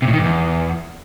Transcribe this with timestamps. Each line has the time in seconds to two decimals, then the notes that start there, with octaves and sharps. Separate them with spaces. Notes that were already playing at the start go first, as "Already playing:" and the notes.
0.02 C3
0.08 A2
0.13 D#3
0.18 G2
0.24 E2